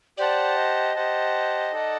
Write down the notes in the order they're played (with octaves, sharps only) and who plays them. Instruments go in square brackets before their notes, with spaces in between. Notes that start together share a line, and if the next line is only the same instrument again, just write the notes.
[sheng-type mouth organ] G4 C5 F#5 A5 [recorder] D5
[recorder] D#5
[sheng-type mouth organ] G4 C5 F#5 A5
D#4 A4 D5 F#5 A5